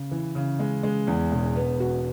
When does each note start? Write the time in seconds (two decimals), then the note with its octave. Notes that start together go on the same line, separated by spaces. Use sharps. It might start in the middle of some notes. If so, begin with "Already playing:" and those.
Already playing: C#3
0.11 E3
0.35 C#3
0.59 G#3
0.83 G#3
1.07 E2
1.31 E1
1.56 B3
1.80 F#4